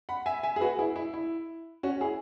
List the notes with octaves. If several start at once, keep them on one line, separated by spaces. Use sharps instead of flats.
F#5 B5
E5 G#5
E5 G#5
G#4
F#4 B4
E4 G#4
E4
E4
C#4 F#4
E4 G#4